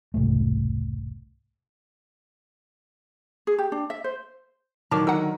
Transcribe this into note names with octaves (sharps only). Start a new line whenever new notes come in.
E1 C2 G#2 A3
G#4
G4
D4
E5
C5
D3 D#3 F#3 A5 D6
D#4 A#4 F#5 E6